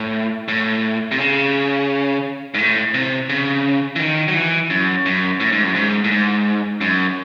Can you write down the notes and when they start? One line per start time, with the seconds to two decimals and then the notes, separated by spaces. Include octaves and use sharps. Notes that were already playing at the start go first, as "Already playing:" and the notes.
Already playing: A2
0.48 A2
1.11 C3
1.19 C#3
2.54 G#2
2.59 A2
2.94 C3
3.29 C#3
3.96 E3
3.99 D#3
4.28 F#3
4.35 E3
4.70 F#2
5.06 F#2
5.40 A2
5.52 G#2
5.64 F#2
5.75 G#2
6.04 A2
6.11 G#2
6.81 F#2